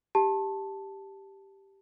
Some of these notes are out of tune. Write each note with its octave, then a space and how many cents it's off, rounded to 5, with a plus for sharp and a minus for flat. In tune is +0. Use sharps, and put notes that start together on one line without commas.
G4 +0 A5 +0